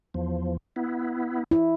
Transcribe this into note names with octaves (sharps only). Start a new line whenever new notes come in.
E2 F3
B3 E4
E4